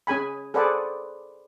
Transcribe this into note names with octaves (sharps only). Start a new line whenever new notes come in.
C#4 G#4 G#5 B5
G#4 A4 B4 C5 D5 F#5